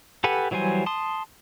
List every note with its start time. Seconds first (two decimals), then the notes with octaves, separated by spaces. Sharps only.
0.24 G4 A4 B4 F#5 G#5
0.51 E3 F#3 G3 C5 G#5
0.86 A5 C6 D#6